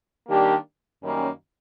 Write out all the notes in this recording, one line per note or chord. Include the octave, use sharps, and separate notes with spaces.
D#3 G3 A#3 D4 G4
F#2 D#3 G3 A#3 C#4